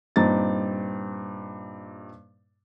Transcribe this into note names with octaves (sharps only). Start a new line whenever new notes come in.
G2 A#2 C4 D#4 A6